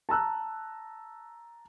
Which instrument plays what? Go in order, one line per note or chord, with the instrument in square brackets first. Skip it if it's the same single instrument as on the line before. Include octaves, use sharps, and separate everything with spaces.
[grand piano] A5 A#5 E6 F#6